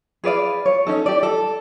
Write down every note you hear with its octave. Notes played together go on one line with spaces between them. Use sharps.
G#4 B4 D5 F5
C#5
C#4 D#4 A4
G4 D5
A4